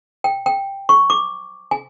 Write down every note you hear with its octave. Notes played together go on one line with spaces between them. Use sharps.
G5
G5
C#6
D6
G#5